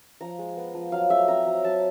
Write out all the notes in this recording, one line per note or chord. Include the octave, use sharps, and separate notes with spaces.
F3 A#5
G#3
B3
F3
F#3 F5
A3 E5
C4 A#5
F#3
F#3 A5